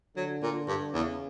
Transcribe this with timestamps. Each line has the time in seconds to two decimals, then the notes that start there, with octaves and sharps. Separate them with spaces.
0.16 D3 F#3
0.43 A#2
0.68 G2
0.94 E2 C#3